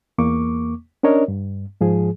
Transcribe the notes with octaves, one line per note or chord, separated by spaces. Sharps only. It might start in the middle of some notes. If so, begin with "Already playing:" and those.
E2 A#3 C#6 D6
C#4 D4 A#4 C#5 D#5
G2
G#2 F3 G#4